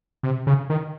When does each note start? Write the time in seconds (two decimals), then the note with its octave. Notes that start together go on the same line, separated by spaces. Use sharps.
0.23 C3
0.47 C#3
0.70 D#3